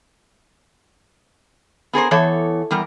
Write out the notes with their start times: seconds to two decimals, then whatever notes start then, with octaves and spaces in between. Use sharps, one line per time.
1.93 B3 G#4 A#4 C5
2.11 E2 E3 A4 C#5
2.71 E2 G3 A#4